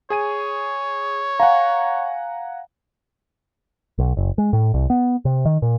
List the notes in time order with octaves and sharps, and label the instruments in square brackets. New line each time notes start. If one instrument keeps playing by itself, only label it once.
[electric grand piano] G#4 G#5 D#7 [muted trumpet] C#5
[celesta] F5 [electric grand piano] F#5 G#5 A#5
[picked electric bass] B1
F#1
G#3
A2
C2
B3
C3
D#3
A#2